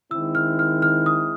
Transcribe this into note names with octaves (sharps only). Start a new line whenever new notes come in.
D#3 G#3 C4 E4 E6
F6
F6
F6
D#6